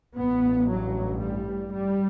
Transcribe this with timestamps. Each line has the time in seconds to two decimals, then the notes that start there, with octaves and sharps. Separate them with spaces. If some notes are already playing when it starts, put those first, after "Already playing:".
0.17 A1 G2 B3
0.69 F#3
1.20 G3
1.72 G3